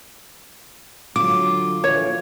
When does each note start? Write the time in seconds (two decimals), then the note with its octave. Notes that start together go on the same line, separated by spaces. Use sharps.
1.16 D3 F#3 F4 D6
1.84 A#1 D3 E3 C#5